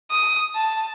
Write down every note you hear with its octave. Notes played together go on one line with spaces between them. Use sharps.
D#6
A5